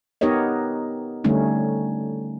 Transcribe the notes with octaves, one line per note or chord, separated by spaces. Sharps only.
B3 D#4 G4 A#4 C#5 D#5
D3 G3 A3 C#4 D#4